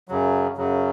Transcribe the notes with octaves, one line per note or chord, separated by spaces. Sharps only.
F#2 C#3 F#3
F#2 C#3 F#3